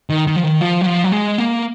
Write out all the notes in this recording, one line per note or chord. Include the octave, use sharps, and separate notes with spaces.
D#3
D#3
F3
D#3
F3
F#3
F3
F#3
G#3
A#3